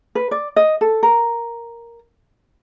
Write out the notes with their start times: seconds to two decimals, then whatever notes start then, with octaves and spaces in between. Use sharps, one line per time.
0.15 B4
0.31 D5
0.56 D#5
0.81 A4
1.03 A#4